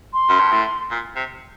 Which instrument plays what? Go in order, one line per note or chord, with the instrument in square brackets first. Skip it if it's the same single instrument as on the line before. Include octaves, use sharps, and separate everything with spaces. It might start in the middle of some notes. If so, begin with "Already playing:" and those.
[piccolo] C6
[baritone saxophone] F#2
G2
A2
A#2
C3